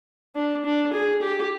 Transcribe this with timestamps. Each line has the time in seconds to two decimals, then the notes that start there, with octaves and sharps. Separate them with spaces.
0.36 D4
0.65 D4
0.93 G#4
1.22 G4